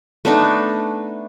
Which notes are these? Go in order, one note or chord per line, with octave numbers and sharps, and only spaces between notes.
A3 B3 D4 D#4